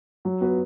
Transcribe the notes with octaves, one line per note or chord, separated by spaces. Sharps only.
F#3
B3 F#4 B4